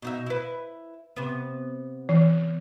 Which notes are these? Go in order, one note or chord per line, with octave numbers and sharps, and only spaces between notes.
B2 D#4 E5
E4 B4
C3 B3
E3